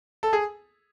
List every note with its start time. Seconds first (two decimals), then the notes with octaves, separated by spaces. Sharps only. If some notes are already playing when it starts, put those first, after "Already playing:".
0.23 A4
0.33 G#4